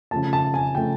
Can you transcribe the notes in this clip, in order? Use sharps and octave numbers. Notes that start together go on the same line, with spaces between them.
C#3 F3 A3 A5
A5
G#5
C#3 F3 A3 G5